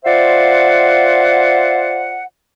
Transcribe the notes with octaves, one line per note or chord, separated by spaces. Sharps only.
F4 C5 D5 E5 F#5